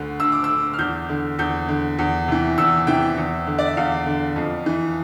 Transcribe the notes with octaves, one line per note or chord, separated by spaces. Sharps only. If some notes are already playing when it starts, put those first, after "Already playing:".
Already playing: D2 D3
D2 E6
D6
E6
D3
F6
E2 G6
D3
E2 G6
D3
E2
C3 E3
E2 E6
C3 E3 G5
E2
D3
D5
E5
E2 F5
D3
F2
E3